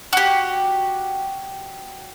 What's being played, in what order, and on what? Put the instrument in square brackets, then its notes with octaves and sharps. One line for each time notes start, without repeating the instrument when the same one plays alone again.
[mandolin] F#4 G4